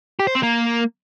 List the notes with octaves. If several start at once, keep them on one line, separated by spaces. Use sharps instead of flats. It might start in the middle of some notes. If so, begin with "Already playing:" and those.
G4
C5
C4
A#3